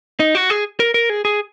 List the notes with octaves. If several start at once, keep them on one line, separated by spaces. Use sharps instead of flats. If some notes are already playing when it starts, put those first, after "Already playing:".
D#4
F#4
G#4
A#4
A#4
G#4
G#4